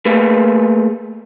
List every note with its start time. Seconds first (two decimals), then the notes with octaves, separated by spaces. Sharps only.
0.05 A3 A#3 G#4 B4